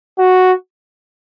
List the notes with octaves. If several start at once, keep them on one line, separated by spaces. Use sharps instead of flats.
F#4